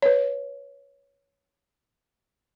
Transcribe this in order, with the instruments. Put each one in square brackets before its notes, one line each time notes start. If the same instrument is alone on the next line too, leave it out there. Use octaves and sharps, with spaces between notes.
[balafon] B4 C#5